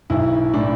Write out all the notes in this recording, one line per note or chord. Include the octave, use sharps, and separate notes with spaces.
B1 E4
A2 D4